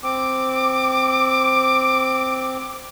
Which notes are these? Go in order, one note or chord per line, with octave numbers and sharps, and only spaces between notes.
C4 D6